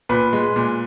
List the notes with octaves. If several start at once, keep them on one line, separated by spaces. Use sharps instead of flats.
A#2 B4
G#3
A#2